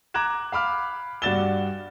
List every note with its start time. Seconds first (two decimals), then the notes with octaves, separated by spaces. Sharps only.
0.14 A#5 D6 F#6 G#6 E7
0.52 F5 B5 D6 F6
1.22 G2 F#4 D5 A6 E7 G7